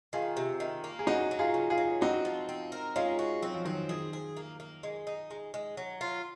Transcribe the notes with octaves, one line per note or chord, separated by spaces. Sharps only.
D#3 F4 G#4
C3
D#3
A#3
G#4
F#3 D#4 F#4
F#3
F4 G#4
C#3
F4 G#4
F#3
C4 D#4 F#4
F3
C4
A#4
G#3 C#4 F4
F#4
F#3 C4
F3
D#3 F#3 C4
D#3 G#4
G#4
A#3
A#3
G#3
D#4
G#3
G#3
F#3
F4